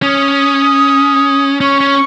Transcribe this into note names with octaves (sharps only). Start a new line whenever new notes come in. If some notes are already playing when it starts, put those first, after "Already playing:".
C#4 D#6
C#4 C#6
C#4